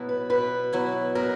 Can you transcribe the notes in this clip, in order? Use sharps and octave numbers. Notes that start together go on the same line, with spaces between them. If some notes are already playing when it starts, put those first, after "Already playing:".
Already playing: B2 F#3 B3 E4
B4
B2 B4
F#3 B3 E4
B2 A#4